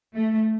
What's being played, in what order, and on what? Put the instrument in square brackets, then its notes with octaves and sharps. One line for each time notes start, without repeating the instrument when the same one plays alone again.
[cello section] A3